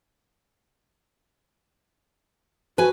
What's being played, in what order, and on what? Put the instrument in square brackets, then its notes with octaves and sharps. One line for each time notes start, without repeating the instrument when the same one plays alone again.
[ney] F#4 [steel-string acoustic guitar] B4 G#5